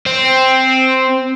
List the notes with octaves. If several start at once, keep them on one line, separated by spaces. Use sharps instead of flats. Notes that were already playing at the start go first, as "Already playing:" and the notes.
C4